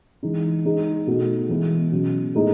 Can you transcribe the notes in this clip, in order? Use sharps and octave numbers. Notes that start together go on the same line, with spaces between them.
E3 G#3 D#4
G#3 D#4 G#4
B2 A3 D#4 F#4
E3 G#3 B3
B2 F#3 C#4
A2 G#3 B3 D#4 G#4